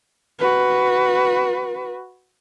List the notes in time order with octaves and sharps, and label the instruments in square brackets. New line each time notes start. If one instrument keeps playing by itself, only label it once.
[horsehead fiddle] F#4 B4